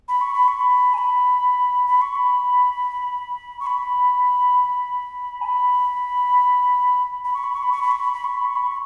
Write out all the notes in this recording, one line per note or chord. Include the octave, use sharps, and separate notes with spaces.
B5
C#6
B5
C#6
B5
G#5
B5
B5
C#6
B5
C#6
B5
G#5
B5
B5
C#6
B5
C#6
B5
C#6
B5
C#6
B5
B5
C#6
B5
C#6
B5
C#6